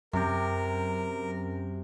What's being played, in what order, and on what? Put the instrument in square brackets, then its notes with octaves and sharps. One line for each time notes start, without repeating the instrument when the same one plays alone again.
[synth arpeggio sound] F#2 [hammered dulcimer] C3 G4 [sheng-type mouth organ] A#4